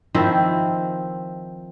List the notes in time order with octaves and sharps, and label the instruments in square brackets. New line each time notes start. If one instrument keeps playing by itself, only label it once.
[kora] D#3 F3 C4 E4